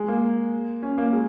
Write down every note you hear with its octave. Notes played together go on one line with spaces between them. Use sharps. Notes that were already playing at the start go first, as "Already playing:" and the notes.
Already playing: G#3
A#3
C#4
A#3
G#3